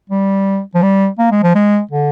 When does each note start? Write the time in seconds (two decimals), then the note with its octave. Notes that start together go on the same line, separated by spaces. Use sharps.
0.10 G3
0.75 F3
0.83 G3
1.19 A#3
1.31 G#3
1.43 F3
1.55 G#3
1.91 D3